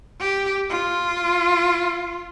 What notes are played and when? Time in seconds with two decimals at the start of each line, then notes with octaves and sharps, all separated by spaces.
0.20 G4
0.70 F4